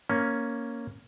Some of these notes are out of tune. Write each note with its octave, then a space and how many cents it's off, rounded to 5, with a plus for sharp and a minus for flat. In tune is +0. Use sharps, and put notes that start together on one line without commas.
A#3 +0 C#4 +0